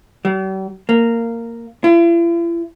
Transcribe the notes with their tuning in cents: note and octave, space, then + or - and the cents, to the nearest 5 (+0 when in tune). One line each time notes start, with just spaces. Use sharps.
G3 -45
A#3 -10
E4 +45